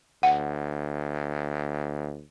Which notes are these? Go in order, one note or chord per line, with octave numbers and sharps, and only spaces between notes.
D2 F#5